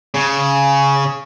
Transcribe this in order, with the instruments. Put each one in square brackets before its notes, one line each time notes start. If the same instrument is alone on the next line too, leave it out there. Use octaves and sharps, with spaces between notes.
[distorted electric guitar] C#3